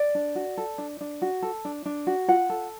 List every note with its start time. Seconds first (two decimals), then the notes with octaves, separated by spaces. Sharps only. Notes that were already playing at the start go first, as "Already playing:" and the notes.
Already playing: D5
0.15 D4
0.35 F#4
0.58 A4
0.78 D4
1.01 D4
1.22 F#4
1.42 A4
1.65 D4
1.86 D4
2.07 F#4
2.28 F4 F#5
2.50 A4